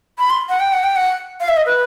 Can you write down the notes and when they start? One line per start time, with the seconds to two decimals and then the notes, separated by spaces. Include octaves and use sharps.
0.19 B5
0.30 C6
0.49 F#5
0.60 G5
0.73 F#5
0.84 G5
0.96 F#5
1.40 F5
1.48 E5
1.57 D#5
1.66 B4